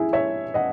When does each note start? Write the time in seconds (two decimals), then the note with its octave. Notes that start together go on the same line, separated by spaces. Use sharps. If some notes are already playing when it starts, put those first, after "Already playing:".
Already playing: E4 G#4
0.13 C#5 E5
0.54 D#5 F#5